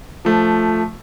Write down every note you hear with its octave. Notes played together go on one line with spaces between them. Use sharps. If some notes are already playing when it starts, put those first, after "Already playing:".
F3 A3